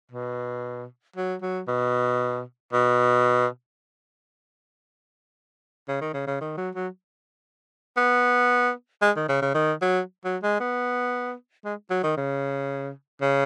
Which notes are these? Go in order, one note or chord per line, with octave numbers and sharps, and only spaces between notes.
B2
F#3
F#3
B2
B2
C#3
D#3
C#3
C#3
D#3
F#3
F#3
B3
G#3
D#3
C#3
C#3
D#3
F#3
F#3
G#3
B3
G#3
F#3
D#3
C#3
C#3